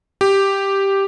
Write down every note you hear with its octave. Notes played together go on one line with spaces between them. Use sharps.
G4